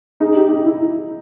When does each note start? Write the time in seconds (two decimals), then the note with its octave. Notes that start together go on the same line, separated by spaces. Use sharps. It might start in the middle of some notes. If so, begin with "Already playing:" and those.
0.20 D#4 G#4
0.35 G4
0.49 D#4
0.63 E4